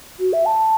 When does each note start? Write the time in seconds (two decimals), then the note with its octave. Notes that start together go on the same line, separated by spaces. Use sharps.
0.20 F#4
0.33 E5
0.46 A5